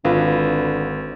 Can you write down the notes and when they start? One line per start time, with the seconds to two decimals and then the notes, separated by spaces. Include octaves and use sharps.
0.05 G#1 D3 F4 B4